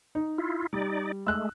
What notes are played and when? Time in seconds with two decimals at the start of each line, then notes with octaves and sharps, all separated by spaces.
0.15 D#4
0.38 E4 F4
0.73 G3 D#4 D5
1.27 G#3 A3 E6 F#6